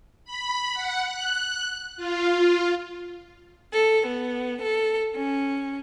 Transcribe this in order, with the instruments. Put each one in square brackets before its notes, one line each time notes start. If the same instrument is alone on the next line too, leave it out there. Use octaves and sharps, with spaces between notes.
[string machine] B5
F#5
F#6
F4
[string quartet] A4
B3
A4
C#4